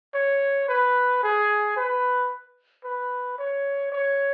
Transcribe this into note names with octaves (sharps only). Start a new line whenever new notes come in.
C#5
B4
G#4
B4
B4
C#5
C#5